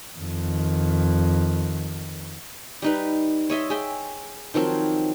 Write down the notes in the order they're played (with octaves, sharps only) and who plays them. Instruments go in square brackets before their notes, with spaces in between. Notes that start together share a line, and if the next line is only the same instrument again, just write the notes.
[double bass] F2 D#3
[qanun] G3 D#4 B4
C#5 D#5 E5 C6
G#4 E5 G5
D#3 F3 F#3 C4